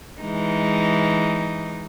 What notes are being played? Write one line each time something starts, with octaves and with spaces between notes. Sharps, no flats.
E3 G#3 D#4